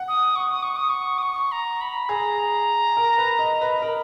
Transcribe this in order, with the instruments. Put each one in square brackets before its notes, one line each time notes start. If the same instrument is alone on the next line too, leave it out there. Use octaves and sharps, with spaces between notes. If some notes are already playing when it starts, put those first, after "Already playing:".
Already playing: [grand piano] F#5
[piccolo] D#6
C#6
D#6
C#6
D#6
C#6
D#6
C#6
A#5
B5
[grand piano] G#4 [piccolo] A#5
[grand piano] A#4
B4
D#5
B4
[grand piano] A#4 [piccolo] B5